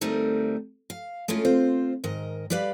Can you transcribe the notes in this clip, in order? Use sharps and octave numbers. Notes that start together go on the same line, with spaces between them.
D2 G3 A3 C4 D#4 A#4
F5
G#3 A3 C#4 E4 F4
C4 F4 C5
G#2 D#3 A#4 D#5
G3 G4 B4 D5 F5